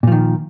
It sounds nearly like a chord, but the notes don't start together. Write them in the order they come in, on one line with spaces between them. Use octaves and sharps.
A#2 F3 D#3